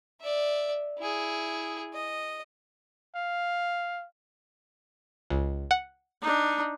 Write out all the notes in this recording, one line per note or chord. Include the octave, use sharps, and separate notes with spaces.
D5 E5
E4 G#4
D#5
F5
C#2
F#5
D4 D#4